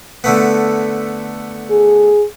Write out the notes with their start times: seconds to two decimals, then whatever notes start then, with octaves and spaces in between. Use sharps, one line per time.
0.24 D3 A3 B3
1.70 G#4